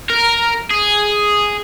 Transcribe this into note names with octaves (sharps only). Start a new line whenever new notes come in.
A#4
G#4